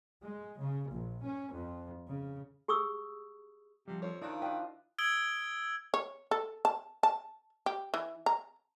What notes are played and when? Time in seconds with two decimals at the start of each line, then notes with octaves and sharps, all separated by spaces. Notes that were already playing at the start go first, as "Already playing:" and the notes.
0.23 G#3
0.60 C#3
0.93 A#1
1.24 C#4
1.55 F2
2.08 C#3
2.68 G4 G#4 C#6 D#6 E6
3.88 C3 F3 G3
4.02 F2 F4 C#5
4.21 D#3 F3 D4 E4 D5
4.42 D4 E4 F4 D#5 G5
4.98 D#6 E6 G#6 D7 G7
5.94 C#5
6.31 A4
6.65 A5
7.03 A5
7.66 G4
7.94 E3
8.26 A#5